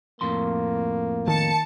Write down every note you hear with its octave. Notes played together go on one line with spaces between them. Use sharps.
F2 A2 A#3 C6
D#3 A5 C#7